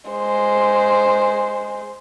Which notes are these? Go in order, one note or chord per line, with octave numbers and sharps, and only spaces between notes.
G#3 C5